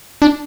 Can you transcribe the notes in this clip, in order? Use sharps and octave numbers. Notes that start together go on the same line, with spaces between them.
D4